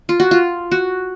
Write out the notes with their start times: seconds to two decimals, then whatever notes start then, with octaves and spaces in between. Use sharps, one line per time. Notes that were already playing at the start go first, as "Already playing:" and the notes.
0.09 F4
0.20 F#4
0.31 F4
0.72 F#4